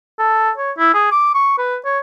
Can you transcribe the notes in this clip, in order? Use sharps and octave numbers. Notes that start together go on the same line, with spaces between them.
A4
C#5
E4
G#4
D6
C#6
B4
C#5